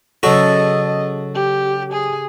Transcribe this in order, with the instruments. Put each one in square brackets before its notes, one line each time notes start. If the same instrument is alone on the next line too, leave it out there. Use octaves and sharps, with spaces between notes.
[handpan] C#3 A4 [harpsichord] F#3 F#4 [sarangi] D#5
[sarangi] G4
G#4